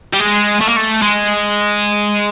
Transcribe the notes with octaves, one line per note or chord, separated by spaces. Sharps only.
G3
G#3
A3
A#3
A3
G#3